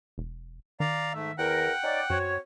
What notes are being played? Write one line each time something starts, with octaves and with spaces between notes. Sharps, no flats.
E1
D#3 D5 F5 A#5
G#2 A3 E5
E2 A#4 F#5 G5 F#6
C#4 D#4 D5
F#2 C4 F#4 C#5